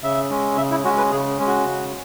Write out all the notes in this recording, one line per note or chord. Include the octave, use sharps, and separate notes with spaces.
C#3 E5
G#3 C#4
C#3 E5
E4
G#3 C#4 F#4
B4
C#3 G#4
G#3 C#4
F#4
C#3